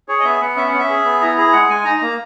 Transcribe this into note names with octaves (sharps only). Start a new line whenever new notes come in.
G#4 C#5
D#5
B3 E5
B3 F#5
C#4 E5
F#5
C#4
E5
G#4
B3
E4 A#5
G#4 A#5
G#3 F#5
G#3 G#5
D#4 A#5
A#3